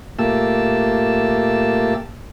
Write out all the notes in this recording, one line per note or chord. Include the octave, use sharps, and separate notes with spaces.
A#2 A3 A#3 G4 A5 E6